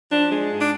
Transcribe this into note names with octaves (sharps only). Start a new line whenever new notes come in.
F3 D4
G#3
G#2
D4